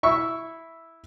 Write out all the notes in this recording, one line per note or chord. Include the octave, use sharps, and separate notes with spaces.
E4 E5 C#6